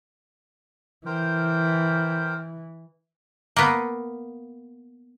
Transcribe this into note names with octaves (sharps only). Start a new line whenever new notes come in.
E3 A#4 C5 G5
A#3 B3